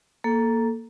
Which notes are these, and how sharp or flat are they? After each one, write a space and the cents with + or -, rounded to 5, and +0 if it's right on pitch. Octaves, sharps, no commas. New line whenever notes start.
A#3 +0 A4 +0